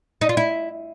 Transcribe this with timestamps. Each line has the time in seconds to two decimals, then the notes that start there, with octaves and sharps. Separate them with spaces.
0.21 D#4
0.29 F4
0.37 E4